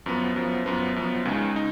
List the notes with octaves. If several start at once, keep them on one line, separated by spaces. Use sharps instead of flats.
F#2 F3 B3
F#2 F3 B3
F#2 F3 B3
F#2 F3 B3
C#2 C#3 G#3 D#4
D#4